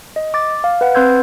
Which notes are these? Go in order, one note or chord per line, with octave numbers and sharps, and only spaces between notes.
D#5
D6 A6
F5
B4 F#5
C4 B4 C6 E6 G6 G#6